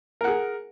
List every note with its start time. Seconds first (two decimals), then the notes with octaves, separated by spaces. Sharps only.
0.21 A#4
0.24 F#5
0.27 G#4